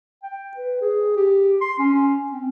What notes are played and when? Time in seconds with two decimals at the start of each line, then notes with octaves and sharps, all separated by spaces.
0.23 G5
0.57 B4
0.81 G#4
1.17 G4
1.61 C6
1.79 C#4
2.32 C4